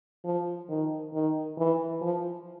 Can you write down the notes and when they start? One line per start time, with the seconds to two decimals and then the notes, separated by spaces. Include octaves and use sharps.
0.25 F3
0.69 D#3
1.14 D#3
1.58 E3
2.01 F3